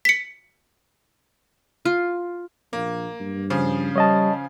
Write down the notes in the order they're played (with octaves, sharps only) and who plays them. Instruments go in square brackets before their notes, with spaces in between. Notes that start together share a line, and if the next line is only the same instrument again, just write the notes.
[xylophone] B6 C#7
[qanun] F4
[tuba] A#1 [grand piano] A#3
[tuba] G2
[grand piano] C#3 F3
[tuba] G3 [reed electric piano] C#5 D#5 A5